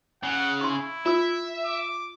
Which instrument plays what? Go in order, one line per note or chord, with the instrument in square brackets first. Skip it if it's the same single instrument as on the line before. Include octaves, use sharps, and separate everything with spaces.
[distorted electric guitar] C#3 [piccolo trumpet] F#5
[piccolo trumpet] E4 [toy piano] C6 C#6
[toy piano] F4 E6 [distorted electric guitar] E5
[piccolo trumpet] D6